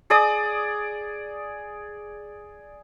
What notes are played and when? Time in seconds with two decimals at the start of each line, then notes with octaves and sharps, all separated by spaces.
0.10 G#4 D5 D#6